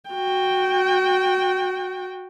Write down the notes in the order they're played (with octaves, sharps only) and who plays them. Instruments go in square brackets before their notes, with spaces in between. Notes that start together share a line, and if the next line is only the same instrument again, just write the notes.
[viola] F#4 G5